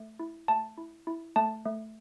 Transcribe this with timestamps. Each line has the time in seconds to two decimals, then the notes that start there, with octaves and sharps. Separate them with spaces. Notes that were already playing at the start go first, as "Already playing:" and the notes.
Already playing: A3
0.20 E4
0.48 A3 A5
0.78 E4
1.07 E4
1.36 A3 A5
1.65 A3